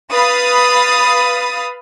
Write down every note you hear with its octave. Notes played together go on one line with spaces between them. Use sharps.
B4 F5 B5 D#6 A6